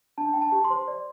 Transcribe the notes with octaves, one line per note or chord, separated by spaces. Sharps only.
D4 A5
D4 G5
A5
G4
C6
C5
D5